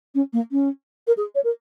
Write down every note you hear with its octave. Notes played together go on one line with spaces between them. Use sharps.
C#4
A#3
C#4
A#4
G#4
C#5
A#4